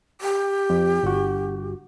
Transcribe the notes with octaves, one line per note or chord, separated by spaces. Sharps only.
G4
F2
G1 F#4